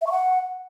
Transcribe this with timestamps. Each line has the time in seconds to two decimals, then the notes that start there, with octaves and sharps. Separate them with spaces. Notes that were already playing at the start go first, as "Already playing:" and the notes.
0.02 E5
0.07 C#6
0.12 F#5